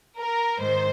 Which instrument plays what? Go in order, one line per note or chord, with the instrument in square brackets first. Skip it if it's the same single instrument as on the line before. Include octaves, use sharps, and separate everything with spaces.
[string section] A#4
G#2 D#3 C5